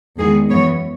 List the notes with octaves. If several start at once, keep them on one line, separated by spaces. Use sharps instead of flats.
E2 D#3 G#3 B3 G#4
F#2 E3 G#3 B3 C#5